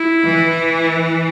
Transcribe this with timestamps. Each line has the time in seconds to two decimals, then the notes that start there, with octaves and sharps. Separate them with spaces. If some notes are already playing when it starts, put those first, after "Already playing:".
Already playing: E4
0.25 E3